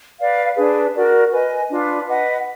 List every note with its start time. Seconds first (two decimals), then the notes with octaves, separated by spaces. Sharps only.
0.19 B4 D5 F5
0.56 D4 G#4 B4
0.94 F#4 A#4 D5
1.31 B4 D#5 G#5
1.69 D4 F4 B4
2.07 B4 D#5 F#5